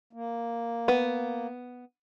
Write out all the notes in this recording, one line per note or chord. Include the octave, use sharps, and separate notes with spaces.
A#3
B3